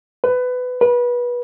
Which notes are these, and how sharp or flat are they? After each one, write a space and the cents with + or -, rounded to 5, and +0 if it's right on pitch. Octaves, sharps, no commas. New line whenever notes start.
B4 +20
B4 -25